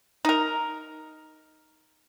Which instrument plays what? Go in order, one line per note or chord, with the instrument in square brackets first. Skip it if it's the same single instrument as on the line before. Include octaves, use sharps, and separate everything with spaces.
[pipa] D#4 A#4